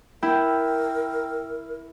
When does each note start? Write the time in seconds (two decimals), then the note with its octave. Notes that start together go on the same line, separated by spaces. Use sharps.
0.23 E4 A#4 G5